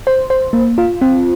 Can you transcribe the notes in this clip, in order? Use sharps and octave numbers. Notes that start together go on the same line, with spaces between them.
C5
C5
A#3
F4
C4